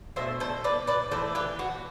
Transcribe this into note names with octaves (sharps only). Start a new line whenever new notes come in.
B2 A3 D4 C5 E5
A4 C5
B4 D5
B4 D5
E3 A3 D4 A4 C5
G4 B4
F#4